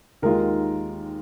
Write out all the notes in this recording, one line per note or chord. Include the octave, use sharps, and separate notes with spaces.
D#2 D#3 G#3 F4 A#4